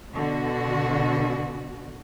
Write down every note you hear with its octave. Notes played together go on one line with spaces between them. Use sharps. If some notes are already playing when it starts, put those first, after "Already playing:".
B2 D3 F#4